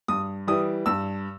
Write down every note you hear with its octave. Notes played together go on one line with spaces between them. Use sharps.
G2 D#6
E3 G3 D#6
G2 E6